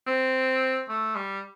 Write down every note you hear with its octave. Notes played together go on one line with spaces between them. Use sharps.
C4
A3
G3